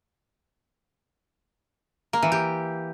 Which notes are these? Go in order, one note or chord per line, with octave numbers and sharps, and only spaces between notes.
A#3
E3
G4